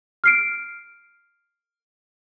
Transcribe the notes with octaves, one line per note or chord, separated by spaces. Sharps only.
F6 C7 D7